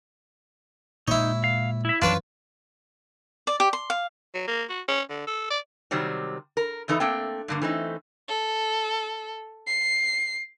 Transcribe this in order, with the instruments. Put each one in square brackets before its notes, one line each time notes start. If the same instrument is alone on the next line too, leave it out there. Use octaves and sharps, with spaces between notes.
[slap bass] A#2 G#3 [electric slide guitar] D#4 [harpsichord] E4 C#5
[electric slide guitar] F5
E4 E5
[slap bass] F#2 E3 F3 [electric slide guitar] D4 [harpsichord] F4 B4 C#5
[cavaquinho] D5
G4
C6
F5
[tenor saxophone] F#3
A#3
F#4
C#4
D3
A4
D5
[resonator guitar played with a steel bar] C3 D#3 F#3 G3 C4
A#4
E2 E3 D#4 A4 B4
A3 A#3 C4 D4 G5
G2 D3 A#3
E3 A3 C4 D#4
[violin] A4
C7